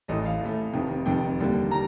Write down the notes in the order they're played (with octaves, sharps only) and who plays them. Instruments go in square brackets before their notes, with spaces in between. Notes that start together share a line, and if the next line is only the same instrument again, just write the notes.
[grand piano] A1 A2 A3 D#5
F5
A1 A2 A3
F1 F2 C3 D#3
F1 F2 C3 D#3 G5
D#2 D3 G3 A#3
G3 A#5